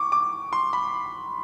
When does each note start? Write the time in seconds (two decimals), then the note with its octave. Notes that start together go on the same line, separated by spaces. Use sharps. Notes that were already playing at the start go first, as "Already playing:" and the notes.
Already playing: C#6 D6
0.12 D6
0.53 C6
0.73 B5